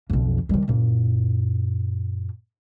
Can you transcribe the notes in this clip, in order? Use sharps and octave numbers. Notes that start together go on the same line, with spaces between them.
B1 F2
D#3 G3
F#2 A#2